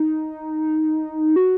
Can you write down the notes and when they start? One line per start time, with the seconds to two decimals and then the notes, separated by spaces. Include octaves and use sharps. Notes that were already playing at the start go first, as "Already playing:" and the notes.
Already playing: D#4
1.36 F#4